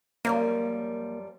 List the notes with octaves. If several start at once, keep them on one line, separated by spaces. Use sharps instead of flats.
F#2 F3 G3 A#3